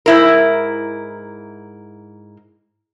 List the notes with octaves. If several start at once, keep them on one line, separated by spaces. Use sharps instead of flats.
G#2 E4 A#4